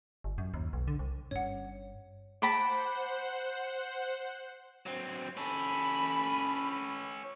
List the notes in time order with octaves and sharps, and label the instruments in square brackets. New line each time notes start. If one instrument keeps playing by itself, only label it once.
[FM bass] G1
F#2
D#2
B1
D3
C2
[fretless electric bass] G1 G2 C#4 [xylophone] C#5 F#5
[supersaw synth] C5 F#5 [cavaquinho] A5 B5 D6
[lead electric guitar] F#3 C4
[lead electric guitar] C#4 A4 [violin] B5